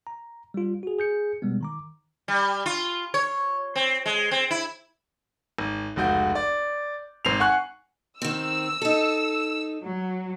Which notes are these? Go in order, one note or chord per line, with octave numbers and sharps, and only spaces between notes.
A#5
G3 F4
F#4 G#4
G#4 G6 C#7
B2 G3 G#3 B3
D#3 A#5 D6
G3
F4
C#5
C4
G#3
C4
E4
G#1
F1 C#2 F#4 G6
D5
G#1 C4 C7 F7
F#5 G#5 C#6 F#6
D#3 C4 E6
D#4 A4
F#3